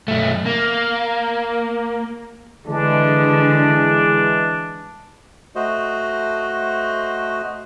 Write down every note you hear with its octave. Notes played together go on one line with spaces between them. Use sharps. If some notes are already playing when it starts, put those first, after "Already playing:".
B1 A3
A#3
D3 E3 G#3 D4
A3 F#4 C5 D#5